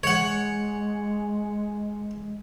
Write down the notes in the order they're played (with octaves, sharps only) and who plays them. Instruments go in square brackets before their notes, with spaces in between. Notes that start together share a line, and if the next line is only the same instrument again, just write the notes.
[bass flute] G#3 [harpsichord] C#5 F#5